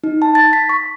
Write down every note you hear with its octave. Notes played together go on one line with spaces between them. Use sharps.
D#4
A5
A6
B6
C#6